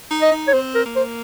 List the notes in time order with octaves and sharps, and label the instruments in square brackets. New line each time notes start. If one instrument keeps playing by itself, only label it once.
[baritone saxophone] D#4
[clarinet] D#5
[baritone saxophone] D#4
[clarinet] C#5
[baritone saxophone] C4 [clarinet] C5
[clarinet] A#4
[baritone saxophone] A#3
[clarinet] C5